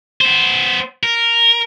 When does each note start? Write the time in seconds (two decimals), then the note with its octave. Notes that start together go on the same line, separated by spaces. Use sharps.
0.21 B3 C5
1.03 A#4